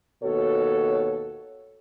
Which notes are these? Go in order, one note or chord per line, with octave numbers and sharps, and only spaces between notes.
D#2 B2 F#4 A4 C#5